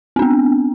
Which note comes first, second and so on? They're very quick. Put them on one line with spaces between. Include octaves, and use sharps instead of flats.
C4 D4 B3